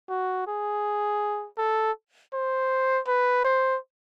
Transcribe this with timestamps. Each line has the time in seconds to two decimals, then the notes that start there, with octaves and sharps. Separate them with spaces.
0.09 F#4
0.47 G#4
1.58 A4
2.33 C5
3.08 B4
3.44 C5